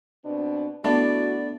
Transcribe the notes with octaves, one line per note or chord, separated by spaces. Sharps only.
B2 C4 D4
B2 A3 B3 D4 E4 F#4 D5